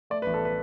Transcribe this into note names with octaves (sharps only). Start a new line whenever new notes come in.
A3 D5
B4
A1
A4
B4